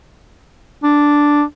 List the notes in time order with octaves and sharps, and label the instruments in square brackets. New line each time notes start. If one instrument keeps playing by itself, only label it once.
[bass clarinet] D4